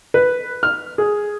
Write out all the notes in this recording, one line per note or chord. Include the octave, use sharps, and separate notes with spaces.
B4
F6
G#4